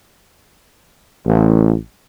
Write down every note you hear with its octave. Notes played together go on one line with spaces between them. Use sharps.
A1